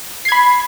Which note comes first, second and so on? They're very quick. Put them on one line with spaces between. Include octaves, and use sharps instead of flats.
C7 G#6 B5